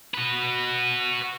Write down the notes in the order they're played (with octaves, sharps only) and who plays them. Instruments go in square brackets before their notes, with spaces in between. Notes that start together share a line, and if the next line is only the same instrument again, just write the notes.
[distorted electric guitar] F#4 B4